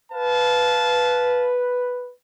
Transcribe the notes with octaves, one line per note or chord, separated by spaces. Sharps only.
B4 F5 A5